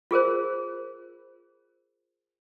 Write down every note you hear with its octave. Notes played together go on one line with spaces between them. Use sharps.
F4 G#4 A#4 C5